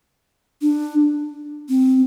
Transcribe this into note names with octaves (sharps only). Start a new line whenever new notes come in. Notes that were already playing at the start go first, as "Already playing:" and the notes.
D4
C4